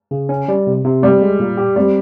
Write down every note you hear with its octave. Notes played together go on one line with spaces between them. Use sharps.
C#3
C#4
G3
C3
C3
G3 C4
G#3
A#2
G4
G3 C4